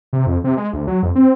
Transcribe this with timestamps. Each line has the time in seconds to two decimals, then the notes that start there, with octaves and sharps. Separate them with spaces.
0.13 C3
0.27 F2
0.44 C3
0.57 G#3
0.73 D2
0.87 F#3
1.03 F2
1.15 C4